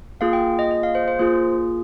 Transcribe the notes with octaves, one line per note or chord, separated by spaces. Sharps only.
A#3 F4 G#4 F5
G5
D#5
D#5
F5
C5
C5
A#3 F4 G#4 C5